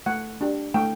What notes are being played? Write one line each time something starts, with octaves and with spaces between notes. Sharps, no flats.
A3 F#5
D4 G4
A3 G5